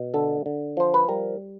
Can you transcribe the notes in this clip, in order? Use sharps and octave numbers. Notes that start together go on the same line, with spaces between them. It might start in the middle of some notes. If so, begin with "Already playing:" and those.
Already playing: B2
D3 A4
D3
F3 C5
B4
G3 A#4